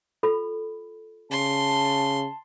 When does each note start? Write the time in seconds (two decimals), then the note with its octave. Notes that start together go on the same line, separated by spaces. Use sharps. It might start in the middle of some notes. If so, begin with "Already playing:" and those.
0.23 F4 A4 B5
1.31 C#3 A5 C6